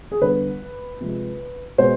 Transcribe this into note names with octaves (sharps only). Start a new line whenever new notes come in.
G#4
D3 G3 B3 B4
C3 F3 G#3
B2 G#3 B3 C5